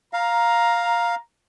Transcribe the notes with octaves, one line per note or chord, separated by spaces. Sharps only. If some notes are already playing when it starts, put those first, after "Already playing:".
F5 A#5